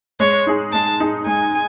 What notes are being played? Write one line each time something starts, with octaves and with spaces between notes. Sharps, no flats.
G#3 C#5
D#4 G#4
G#3 A5
D#4 G#4
G#3 G#5